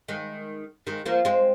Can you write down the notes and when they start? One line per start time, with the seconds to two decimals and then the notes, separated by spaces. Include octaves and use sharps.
0.08 D#3 G#3
0.87 D#3 G#3
1.06 F3 A#3
1.25 G#3 C4